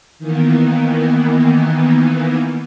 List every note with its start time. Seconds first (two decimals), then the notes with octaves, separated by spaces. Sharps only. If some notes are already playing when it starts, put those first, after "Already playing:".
0.19 D#3 E3 A#3 B3